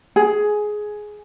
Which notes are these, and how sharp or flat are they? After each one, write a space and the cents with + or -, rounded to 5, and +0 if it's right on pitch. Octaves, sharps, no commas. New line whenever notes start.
G#4 +10